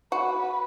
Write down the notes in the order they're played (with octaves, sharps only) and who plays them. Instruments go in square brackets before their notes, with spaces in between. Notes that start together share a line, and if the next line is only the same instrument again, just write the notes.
[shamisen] F#4 [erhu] B4